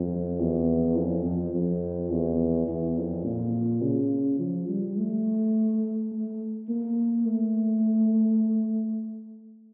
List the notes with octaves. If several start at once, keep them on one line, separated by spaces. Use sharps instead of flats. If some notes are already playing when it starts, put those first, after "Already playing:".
Already playing: F2
E2
F2
F2
F2
E2
E2
F2
A#2
C#3
F3
G3
A3
A3
A#3
A3